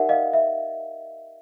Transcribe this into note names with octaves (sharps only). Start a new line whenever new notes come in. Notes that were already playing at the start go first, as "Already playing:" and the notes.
Already playing: D#4 G4 A#4 D5 E5 F#5
D#5 F5
E5